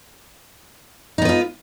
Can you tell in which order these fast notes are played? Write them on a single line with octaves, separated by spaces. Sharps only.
D#4 B3 B4 F4